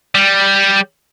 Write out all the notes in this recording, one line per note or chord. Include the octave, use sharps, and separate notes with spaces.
G3